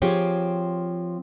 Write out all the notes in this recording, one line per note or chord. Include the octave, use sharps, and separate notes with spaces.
F3 C4 F4 G4 G#4 C#5